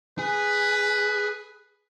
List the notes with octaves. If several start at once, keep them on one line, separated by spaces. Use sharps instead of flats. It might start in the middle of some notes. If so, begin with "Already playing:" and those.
G#4 B4